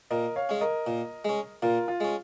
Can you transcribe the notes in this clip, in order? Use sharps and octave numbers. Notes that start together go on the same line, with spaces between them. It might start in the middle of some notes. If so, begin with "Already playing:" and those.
A#2 A#4 D#5
C#5 F5
G#3 C#4
A#4 D#5
A#2
G#3 C#4
A#2 F4 A#4
F4
G#3 C#4